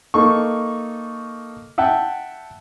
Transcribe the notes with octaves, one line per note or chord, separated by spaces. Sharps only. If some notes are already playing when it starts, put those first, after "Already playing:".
A#3 D#4 A4 C#6
E5 F#5 G5 A5